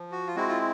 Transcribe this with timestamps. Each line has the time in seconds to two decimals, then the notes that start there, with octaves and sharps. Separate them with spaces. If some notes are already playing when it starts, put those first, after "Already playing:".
Already playing: F3
0.12 F#4
0.27 F4
0.35 G#3 C4 E4 F#4
0.48 F4